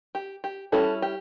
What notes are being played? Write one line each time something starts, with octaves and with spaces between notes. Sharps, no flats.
G4
G4
G3 C#4 E4 F#4 A4
G4